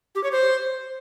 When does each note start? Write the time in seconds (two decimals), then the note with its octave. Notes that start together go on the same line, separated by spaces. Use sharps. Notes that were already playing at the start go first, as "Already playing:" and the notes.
0.15 G4
0.23 C#5
0.32 C5